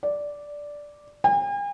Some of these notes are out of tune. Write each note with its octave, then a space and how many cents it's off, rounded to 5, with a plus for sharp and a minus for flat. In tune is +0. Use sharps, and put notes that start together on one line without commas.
D5 -5
G#5 -45